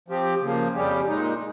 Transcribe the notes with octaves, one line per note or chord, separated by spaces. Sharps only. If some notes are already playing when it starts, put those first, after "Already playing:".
F3 C4 G4
C#3 F3 A#3
F2 C#3 G3 C#4 G4
A#2 G#3 D#4